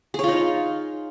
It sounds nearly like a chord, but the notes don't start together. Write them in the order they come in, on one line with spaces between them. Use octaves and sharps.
G#4 C#5 F4 D#4